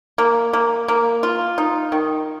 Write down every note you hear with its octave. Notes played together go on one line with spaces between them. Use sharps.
A#3
A#3
A#3
F4
D#4
D#3